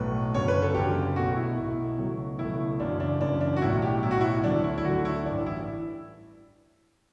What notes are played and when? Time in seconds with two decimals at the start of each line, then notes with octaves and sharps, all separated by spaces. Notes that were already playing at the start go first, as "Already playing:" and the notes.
Already playing: B1 A2 F#3 A3 B4
0.34 F#1 F#2 D3 C#5
0.48 B4
0.62 A4
0.74 F#1 F#2 D3 G4
1.16 B1 B2 A3 F#4
1.36 E4
1.57 B1 B2 A3
1.98 C#2 B2 F#3 A3
2.39 C#2 B2 F#3 A3 E4
2.79 F#1 F#2 C#3 E3 D4
3.00 D4
3.20 F#1 F#2 C#3 E3 D4
3.41 D4
3.56 F#4
3.61 B1 A2 F#3 E4
3.82 G4
4.03 B1 A2 F#3 E4
4.11 F#4
4.21 E4
4.44 D2 D3 F#3 A3 D4
4.64 E4
4.78 E4
4.84 D2 D3 F#3 A3 F#4
5.05 E4
5.25 A1 G2 E3 G3 D4
5.46 E4